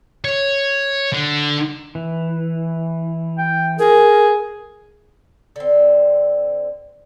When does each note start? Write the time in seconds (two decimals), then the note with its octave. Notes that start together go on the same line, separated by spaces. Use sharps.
0.25 C#5
1.13 D3
1.95 E3
3.38 G5
3.79 G#4 A#4
5.56 D3 C4